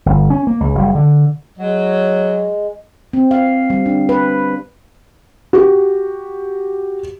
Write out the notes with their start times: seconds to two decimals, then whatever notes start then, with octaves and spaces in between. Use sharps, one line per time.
0.06 G1
0.30 C#4
0.47 A#3
0.60 C#2
0.75 F#1 G3
0.95 D3
1.58 F#3 G#3
3.13 C4
3.31 F5
3.70 G3
3.86 D4
4.09 B4
5.53 F#4 G4